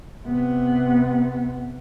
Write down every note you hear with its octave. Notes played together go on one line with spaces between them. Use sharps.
C3 B3